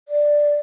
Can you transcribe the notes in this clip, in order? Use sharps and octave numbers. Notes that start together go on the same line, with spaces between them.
D5